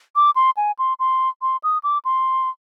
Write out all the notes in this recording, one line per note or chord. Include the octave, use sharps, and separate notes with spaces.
D6
C6
G#5
C6
C6
C6
D#6
D6
C6